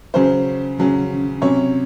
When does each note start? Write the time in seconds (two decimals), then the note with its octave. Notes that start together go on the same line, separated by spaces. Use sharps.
0.14 C#3 F#3 C#4 C5
0.79 C#3 F#3 C#4
1.41 C3 F#3 C#4 C#5